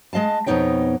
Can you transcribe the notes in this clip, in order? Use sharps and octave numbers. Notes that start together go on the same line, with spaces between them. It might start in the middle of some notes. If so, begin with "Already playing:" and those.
G#3 D#5 F5 A5
F2 B2 B3 D#4 C#5 G5